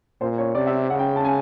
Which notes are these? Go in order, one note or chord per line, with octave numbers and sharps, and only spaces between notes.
A#2 C5
C#5
C3 D5
E5
C#3 F#5
G5
A5
G#5